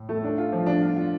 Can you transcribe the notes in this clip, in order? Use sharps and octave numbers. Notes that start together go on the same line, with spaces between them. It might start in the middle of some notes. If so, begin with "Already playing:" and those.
Already playing: A2
A3
D4
F4
F3
D4
F4
F4